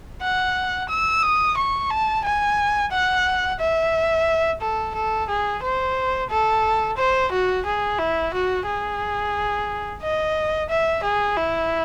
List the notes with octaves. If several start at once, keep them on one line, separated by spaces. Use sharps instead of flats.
F#5
E6
D#6
C#6
A5
G#5
F#5
E5
A4
A4
G#4
C5
A4
C5
F#4
G#4
E4
F#4
G#4
D#5
E5
G#4
E4